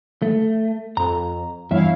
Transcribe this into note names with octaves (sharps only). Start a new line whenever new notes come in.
A3
F2 A#5
E2 G2 E4 C#5 E5 F5